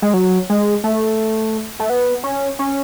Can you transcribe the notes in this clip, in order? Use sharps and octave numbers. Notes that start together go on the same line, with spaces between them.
G#3
F#3
G#3
A3
A3
B3
C#4
C#4